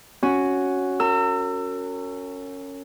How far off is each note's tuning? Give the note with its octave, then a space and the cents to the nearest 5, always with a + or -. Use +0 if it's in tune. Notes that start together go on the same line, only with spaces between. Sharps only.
C#4 +0 F#4 +0
A#4 -35 E6 +20